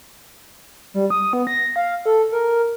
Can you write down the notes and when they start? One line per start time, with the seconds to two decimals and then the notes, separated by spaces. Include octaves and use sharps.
0.94 G3
1.10 D#6
1.33 B3
1.47 A#6
1.76 F5
2.06 A4
2.32 A#4